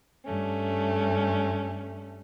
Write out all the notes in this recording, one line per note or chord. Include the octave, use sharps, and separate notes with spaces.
G2 A3 C#4